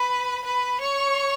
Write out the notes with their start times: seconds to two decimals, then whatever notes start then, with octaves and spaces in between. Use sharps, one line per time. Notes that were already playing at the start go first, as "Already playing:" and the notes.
Already playing: B4 B5
0.44 B4 B5
0.80 C#5 C#6